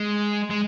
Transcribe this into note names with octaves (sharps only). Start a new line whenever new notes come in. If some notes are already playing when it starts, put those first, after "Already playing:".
Already playing: G#3
G#3